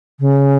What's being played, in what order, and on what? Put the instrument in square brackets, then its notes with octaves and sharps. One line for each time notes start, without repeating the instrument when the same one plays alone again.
[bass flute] C#3